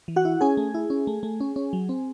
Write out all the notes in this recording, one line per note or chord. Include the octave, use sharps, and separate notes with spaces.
E3
F#4 F#5
E4
C#4 G#4 G#5
A3
E4
C#4
A3
A3
C#4
C#4
F#3
C4